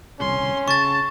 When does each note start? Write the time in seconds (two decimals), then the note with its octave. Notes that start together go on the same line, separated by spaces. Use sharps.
0.20 D#1 C2 C#3 C#4 C6
0.68 C#3 A5 C#6 A6